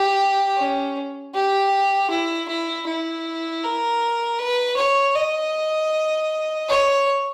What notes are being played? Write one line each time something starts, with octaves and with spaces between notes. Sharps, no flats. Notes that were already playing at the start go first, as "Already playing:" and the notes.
Already playing: G4
C#4
G4
E4
E4
E4
A#4
B4
C#5
D#5
C#5